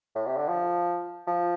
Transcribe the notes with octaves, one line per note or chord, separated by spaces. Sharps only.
A2
C3
D3
F3
F3